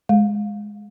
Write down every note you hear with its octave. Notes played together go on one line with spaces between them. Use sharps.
G#3